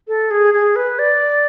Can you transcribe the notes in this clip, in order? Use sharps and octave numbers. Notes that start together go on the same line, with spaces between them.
A4
G#4
G#4
B4
D5